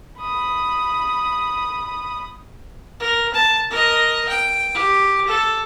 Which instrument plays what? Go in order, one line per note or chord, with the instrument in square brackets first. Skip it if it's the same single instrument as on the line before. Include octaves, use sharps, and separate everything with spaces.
[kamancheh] B5 D#6
[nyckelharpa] A#4
A5
A#4 D#5
G5
G4
A4